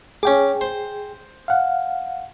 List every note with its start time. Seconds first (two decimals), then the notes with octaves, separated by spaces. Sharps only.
0.23 C#4 G#4 G5 D6
0.61 C5
1.48 F5 F#5